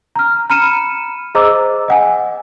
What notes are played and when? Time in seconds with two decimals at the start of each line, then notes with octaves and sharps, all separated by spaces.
0.16 A#5 F6
0.50 A#5 B5 F6 C#7 D#7 E7
1.35 G#4 C5 D#5 A#5 D6 E6
1.88 D#5 F#5 G#5